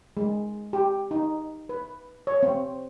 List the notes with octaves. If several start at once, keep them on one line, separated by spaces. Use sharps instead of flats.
G#3
G4
D#4
B4
C#5
C4